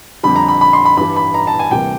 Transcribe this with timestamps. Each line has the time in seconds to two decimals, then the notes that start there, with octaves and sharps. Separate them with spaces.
0.23 F2 D3 G3 B5
0.36 A#5
0.48 B5
0.61 B5
0.73 C6
0.85 B5
0.97 G2 E3 G3 B5
1.16 B5
1.34 A#5
1.47 A5
1.59 G#5
1.71 D2 C3 E3 G3 A#3 G5